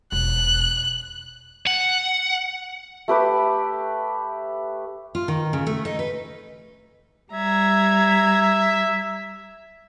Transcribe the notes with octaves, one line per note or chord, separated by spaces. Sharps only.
E1 F#6
F#5
A3 G4 B4 D6
F4
D#3
C#3
A3
D#4
B4
G3 E5 A#5 G#6